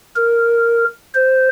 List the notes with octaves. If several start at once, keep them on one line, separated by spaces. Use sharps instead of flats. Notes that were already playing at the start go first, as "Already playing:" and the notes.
A#4
C5